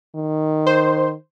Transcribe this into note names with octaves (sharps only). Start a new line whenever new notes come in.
D#3
C5